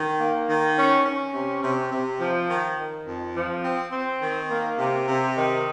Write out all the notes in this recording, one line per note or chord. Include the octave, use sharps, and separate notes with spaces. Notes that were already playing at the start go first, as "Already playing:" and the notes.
Already playing: D#3
A#3
D#3
C#4
C#4
C3
C3
C3
F3
D#3
D#3
F2
F3
C4
C4
D#3
A#3
C3
C3
D#3